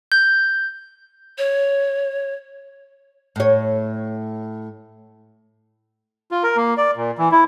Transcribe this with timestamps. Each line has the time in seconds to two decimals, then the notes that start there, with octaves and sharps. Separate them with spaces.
0.12 G6
1.38 C#5
3.36 A2 C#5
6.31 F4
6.43 A#4
6.57 A#3
6.77 D5
6.97 A#2
7.18 E3
7.31 E4